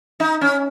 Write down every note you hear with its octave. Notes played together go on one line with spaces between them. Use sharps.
D#4
C#4